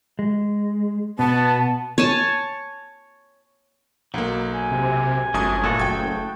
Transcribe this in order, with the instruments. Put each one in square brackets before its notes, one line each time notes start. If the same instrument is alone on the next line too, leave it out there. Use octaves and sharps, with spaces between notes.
[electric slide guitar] G#3
[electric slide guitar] B2 [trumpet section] B3 [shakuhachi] A5
[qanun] C#5 G#5 A5
[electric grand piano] B1 A#3 [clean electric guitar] F#3
[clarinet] G#5
[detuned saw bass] C3
[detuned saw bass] G1 [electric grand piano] F#2 D#6 G#6 [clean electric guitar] A3
[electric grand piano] A#2 [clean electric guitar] A3 F#4 A4
[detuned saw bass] F#1 [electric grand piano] G5 G#6